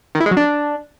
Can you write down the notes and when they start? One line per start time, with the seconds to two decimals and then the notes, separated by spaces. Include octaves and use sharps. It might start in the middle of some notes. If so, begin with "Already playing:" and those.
0.15 D#3
0.20 E4
0.26 G#3
0.31 F#3
0.37 D4